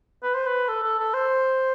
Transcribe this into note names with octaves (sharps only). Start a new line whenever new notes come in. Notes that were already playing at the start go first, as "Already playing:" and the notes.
B4
C5
B4
A4
A4
A4
C5